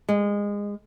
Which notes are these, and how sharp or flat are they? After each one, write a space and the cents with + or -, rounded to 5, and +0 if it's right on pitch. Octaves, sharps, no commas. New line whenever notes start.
G#3 -25